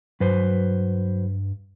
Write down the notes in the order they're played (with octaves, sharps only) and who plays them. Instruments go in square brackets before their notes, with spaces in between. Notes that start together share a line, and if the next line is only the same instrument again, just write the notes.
[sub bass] G2 [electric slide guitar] F#3 B4 C5